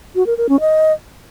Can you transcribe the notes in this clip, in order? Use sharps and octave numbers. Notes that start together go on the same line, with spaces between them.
F#4
A#4
A#4
C#4
D#5